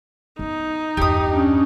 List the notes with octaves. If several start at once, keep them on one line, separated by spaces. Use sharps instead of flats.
B3 C#4 D#4
E2 G2 G4 D#6
C#4 D4